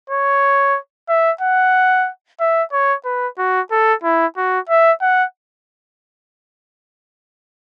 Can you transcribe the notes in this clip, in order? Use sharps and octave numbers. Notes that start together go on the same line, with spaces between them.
C#5
E5
F#5
E5
C#5
B4
F#4
A4
E4
F#4
E5
F#5